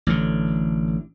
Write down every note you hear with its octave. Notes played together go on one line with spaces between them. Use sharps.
A1 D3